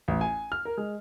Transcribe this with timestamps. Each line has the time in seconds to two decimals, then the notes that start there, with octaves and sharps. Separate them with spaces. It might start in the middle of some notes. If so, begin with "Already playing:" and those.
0.08 A1
0.21 G#5
0.52 F6
0.65 A#4
0.77 G#3